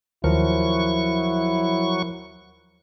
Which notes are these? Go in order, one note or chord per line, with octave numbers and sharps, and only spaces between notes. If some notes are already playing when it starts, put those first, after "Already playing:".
D#2 F3 F#3 E4 A#4 C#6